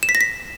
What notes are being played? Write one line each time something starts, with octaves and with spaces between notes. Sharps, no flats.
E7
B6
A#6
B6